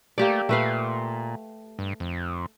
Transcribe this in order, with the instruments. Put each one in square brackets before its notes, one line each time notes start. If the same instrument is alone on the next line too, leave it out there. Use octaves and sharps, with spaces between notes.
[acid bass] A3 [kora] A#3 G4 D5
[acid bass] A#2 [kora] A3 B4 F5
[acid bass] G2
F2